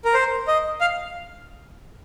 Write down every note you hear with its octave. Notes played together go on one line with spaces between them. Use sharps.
A#4
C5
D#5
F5